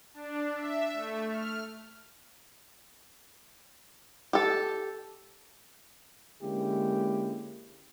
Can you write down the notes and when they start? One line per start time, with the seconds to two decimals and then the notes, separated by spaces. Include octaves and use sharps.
0.14 D4
0.55 E5
0.93 A3
1.28 F6
4.33 G4 A4
6.43 D3 G#3 A#3 C#4 E4 G4